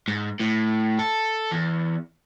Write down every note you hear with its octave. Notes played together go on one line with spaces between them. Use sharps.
G#2
A2
A4
E2